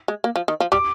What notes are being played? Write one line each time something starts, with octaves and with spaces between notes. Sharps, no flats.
G#3
A#3
F3
D#3
F3
G3 D6